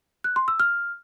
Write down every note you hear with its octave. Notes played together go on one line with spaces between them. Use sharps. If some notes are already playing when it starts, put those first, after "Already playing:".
F#6
C6
E6
F6